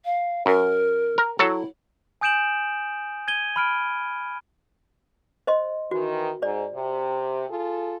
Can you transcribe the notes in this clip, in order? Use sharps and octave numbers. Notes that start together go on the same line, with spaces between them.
F5
F#2 A#4
A#4
F#3 E4 A4
G#5 D#6 G6 D7 E7 F#7
G#6 D#7 G7
B5 F6 D7
C5 D#5 C6
D#3 E3 F#4
G#2 C5 D5
C3
F4 G#4 A4